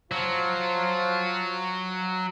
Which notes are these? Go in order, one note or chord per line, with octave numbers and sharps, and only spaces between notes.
F3 F#3 F4